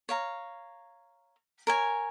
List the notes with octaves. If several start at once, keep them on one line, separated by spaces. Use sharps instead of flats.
C#5 F5 A#5
A#4 C#5 G#5